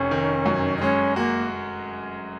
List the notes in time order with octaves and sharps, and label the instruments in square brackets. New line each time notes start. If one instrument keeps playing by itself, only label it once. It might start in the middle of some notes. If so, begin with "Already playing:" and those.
Already playing: [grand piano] F1 [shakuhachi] C#4
[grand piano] D#3
F#2
[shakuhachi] D#4
[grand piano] G#3 [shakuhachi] C#4
[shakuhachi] A#3 [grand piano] F#4